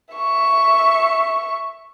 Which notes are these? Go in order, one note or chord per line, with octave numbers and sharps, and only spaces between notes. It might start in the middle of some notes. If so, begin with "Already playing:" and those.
E5 C#6